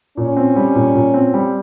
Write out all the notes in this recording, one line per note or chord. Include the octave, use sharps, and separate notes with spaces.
A#2 C#4
C4
G3
A#2
A#2
C4
G3